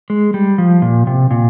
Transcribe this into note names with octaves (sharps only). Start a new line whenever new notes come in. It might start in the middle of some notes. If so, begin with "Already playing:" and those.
G#3
G3
F3
A#2
C3
A#2